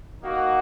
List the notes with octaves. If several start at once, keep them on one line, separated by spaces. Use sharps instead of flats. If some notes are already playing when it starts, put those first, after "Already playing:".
A#3 D#4 F#4